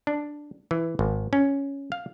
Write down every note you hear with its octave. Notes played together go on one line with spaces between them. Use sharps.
D4
E3
G#1
C#4
F5